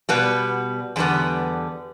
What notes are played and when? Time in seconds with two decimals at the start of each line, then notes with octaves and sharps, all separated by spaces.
0.09 B2 G3 B3
0.96 E2 D3 G3 B3